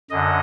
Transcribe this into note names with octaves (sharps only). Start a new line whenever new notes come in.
F#2 D3 D#5